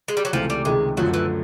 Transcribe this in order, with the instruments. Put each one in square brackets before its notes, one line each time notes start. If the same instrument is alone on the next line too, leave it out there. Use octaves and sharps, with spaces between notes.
[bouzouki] G#3
G3
F#3
[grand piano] C#2 C3 E3 A3 [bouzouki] F3
[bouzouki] G3
[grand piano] C#2 C3 D#3 [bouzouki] G#3
[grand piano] F#2 D3 F3 A3 [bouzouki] F#3
[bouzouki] E3